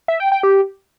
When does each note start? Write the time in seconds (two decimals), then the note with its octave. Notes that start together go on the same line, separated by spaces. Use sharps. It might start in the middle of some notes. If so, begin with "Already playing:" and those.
0.08 E5
0.20 G5
0.32 G5
0.43 G4